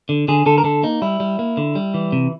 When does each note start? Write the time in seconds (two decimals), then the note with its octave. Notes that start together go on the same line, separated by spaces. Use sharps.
0.09 D3
0.28 D3 G#4
0.46 D3 A4
0.58 A#4
0.64 D3 A4
0.83 A#3 D#4
1.02 G3 E4
1.20 G3
1.39 A#3
1.57 D3
1.75 G3
1.94 E3
2.12 C3